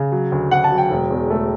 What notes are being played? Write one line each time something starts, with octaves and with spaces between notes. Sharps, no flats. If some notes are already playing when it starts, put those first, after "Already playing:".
Already playing: C#3
F#3
D2
D2 F#5
A5
F#3
G5
E1
E2
A3